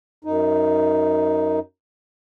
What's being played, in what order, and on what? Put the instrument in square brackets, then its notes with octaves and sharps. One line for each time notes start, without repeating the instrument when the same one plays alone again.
[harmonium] F#2 D#4